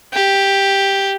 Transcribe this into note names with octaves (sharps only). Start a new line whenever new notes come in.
G4